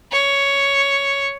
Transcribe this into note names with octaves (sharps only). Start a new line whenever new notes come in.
C#5